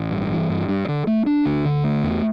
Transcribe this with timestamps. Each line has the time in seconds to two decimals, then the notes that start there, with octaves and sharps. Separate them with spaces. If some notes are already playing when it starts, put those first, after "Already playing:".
Already playing: A1
0.11 G2
0.30 E3
0.49 G2
0.68 G2
0.88 D3
1.07 A3
1.26 D4
1.45 D2
1.65 D3
1.84 A3
2.03 E2